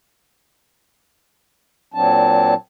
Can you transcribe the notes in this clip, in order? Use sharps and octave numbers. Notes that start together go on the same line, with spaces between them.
A#2 F#3 C4 D4 A5